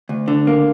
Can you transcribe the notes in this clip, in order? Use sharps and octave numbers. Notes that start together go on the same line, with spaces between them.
D2
D3
A#3